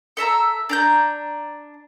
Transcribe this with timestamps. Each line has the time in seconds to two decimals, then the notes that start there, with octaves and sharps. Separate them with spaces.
0.17 A4 E5 A5 A#5
0.69 D4 A#5 G6